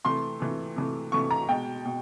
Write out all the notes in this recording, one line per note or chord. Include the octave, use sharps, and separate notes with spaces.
C3 E3 A3 C6
C3 E3 A3
C3 E3 A3
C3 E3 A3 C#6
A#5
B2 G#3 G5
B2